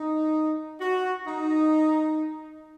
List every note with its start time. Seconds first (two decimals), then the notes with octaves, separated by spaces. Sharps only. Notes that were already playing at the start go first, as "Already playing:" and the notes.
Already playing: D#4
0.81 F#4
1.27 D#4